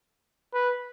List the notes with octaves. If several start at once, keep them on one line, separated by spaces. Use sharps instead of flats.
B4